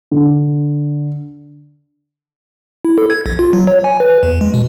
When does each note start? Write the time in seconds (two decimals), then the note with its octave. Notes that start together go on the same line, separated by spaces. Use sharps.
0.11 D3
2.85 E4
2.98 A4
3.10 G#6
3.26 A#1
3.39 F4
3.53 F#3
3.67 C#5
3.84 G#5
4.00 B4
4.23 E2
4.41 G#3
4.54 B2